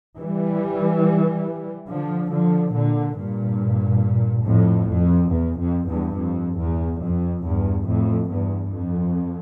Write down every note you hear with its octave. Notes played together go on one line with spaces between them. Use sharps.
E3 G3
D3 F3
D3 F3
A#2 D3
G2 A#2
F2 A2
F2
E2
F2
E2 G2
F2
E2
F2
E2 G2
F2 A2
E2 G2
F2